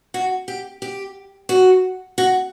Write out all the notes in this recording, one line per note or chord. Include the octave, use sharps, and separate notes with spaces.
F#4
G4
G4
F#4
F#4